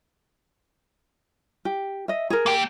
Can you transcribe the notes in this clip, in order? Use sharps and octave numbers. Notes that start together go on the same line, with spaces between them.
G4
D#5 E5
G#4 A#4
A#3 G5